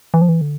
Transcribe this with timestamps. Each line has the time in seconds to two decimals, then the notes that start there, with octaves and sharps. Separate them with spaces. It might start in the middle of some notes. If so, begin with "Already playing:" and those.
0.14 E3
0.22 F3
0.29 E3
0.41 D3